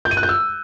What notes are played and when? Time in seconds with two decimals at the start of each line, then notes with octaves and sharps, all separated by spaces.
0.05 G6
0.11 D#7
0.17 F#6
0.23 G6
0.29 E6